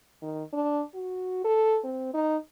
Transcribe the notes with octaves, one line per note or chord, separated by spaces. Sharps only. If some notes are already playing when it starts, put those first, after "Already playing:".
D#3
D4
F#4
A4
C4
D#4